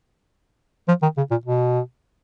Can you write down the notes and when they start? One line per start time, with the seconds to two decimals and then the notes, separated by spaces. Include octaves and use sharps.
0.88 F3
1.02 D#3
1.17 C#3
1.31 A#2
1.45 B2